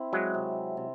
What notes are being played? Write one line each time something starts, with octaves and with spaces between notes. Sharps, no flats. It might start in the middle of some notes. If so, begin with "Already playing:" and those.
Already playing: C4 E4
F#3 G#3
C3
C3